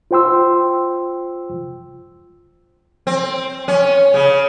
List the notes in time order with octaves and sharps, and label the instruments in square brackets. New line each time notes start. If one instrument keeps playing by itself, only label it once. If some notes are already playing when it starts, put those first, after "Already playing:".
[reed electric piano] F4 C5 G5 C6 E6
[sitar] C4
C#4
C#3